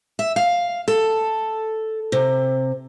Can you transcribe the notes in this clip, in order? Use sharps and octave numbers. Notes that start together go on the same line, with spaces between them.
E5
F5
A4
C3